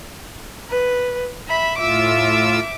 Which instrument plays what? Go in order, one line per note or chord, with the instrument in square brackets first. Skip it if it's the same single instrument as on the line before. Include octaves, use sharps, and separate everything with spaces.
[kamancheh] B4
E5 B5
[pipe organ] A2 F4 E6 [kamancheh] E5 D6